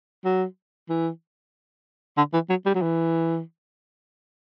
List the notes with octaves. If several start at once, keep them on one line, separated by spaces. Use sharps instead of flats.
F#3
E3
D3
E3
F#3
G3
F#3
E3